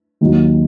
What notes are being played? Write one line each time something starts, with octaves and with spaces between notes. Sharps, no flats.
D#2 D#3 F#3